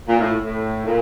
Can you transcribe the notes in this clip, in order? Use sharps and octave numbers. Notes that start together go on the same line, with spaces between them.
A#2
A2
A2
A#2